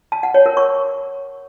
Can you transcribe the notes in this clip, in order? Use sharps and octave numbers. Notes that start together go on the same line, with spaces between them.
A5
F#5
C#5
A#4
C#6